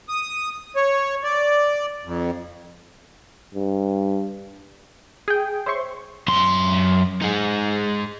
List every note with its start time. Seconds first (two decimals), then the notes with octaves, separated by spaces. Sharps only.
0.09 D#6
0.76 C#5
1.24 D5
2.05 F2
3.55 G2
5.28 G#4 G5
5.66 C5 C#5 E5 C6 C#6
6.28 F#2 C6
7.22 D#4 G#4